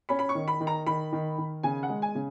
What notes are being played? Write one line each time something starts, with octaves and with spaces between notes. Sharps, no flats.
C#4 B5
B5
C#6
D#3
B5
D#3
A#5
D#3 B5
D#3
D#3
C#3 G#5
F#5
G#3
G#5
C#3